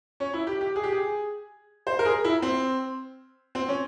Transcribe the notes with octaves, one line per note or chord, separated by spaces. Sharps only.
C#4
E4
G4
G4
G#4
G4
G#4
C5
A#4
G#4
E4
C4
C4
C#4